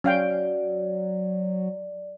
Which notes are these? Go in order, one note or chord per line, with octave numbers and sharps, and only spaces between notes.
F#3 C#4 D5 F5 G5